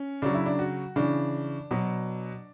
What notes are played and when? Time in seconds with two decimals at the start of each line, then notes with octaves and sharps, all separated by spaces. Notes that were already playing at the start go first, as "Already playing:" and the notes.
Already playing: C#4
0.22 C#3 F#3 D4
0.34 E4
0.46 D4
0.59 F#4
0.96 C#3 E3 D4
1.71 B2 F#3